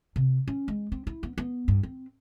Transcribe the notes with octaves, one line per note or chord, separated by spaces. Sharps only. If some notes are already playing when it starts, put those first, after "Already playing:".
C3
C#4
G#3
C4
E4
B3
B3
G2
C4